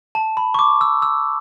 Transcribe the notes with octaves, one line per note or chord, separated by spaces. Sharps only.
A5
B5
C#6
D6
E6
E6